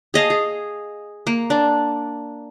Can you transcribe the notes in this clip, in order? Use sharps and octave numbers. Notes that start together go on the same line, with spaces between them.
G#4 D#5 F5 A5
G#4
A#3
D4